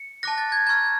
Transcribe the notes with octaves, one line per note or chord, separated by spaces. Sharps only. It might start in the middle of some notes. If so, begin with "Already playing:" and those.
Already playing: C#7
A5 D6 F#6 A#6
A6
G#6
A#5 C#6 F6 G#6